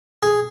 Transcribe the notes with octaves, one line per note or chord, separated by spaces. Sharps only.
G#4